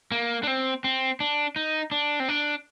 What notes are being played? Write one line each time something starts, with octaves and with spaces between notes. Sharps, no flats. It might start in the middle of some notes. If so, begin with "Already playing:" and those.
A#3
D4
C4
C4
D4
D#4
D4
C4
D4